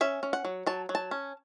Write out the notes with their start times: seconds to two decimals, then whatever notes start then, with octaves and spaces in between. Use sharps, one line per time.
0.01 C#4 E5
0.23 C#4
0.33 F#5
0.45 F#3
0.66 F#3 A5
0.89 F#3
0.95 A5
1.11 C#4